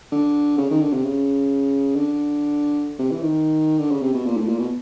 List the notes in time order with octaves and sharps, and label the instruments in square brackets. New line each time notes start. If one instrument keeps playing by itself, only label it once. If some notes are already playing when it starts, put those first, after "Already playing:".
[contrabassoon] D3
C#3
D#3
D3
C3
C#3
D3
C3
E3
D#3
D3
C#3
C3
B2
A#2
A2
A#2
B2